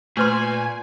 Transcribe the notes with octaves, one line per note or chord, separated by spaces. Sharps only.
A#2 A3 F4 B4 G#5 C6